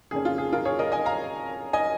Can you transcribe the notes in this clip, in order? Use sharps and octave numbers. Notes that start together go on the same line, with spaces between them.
F2 C#3 A#3 C#4 G#4
F4
G#4
F4 A#4
G#4 C#5
A#4 D#5
D#5 G#5
F5 A#5
D#5 G#5